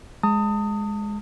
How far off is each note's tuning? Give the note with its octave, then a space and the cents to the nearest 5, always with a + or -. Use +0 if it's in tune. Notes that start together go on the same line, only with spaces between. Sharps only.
G#3 +0 A5 +40 D#6 +5